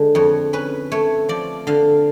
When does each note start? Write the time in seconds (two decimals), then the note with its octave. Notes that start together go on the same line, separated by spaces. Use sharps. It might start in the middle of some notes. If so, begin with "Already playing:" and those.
Already playing: D3 G#3
0.15 F2 C#5
0.53 C#4 B4
0.92 A3 C#5
1.29 F3 D5
1.67 D3 F5